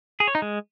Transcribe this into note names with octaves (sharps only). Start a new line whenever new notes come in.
G#4
C#5
D#4
G#3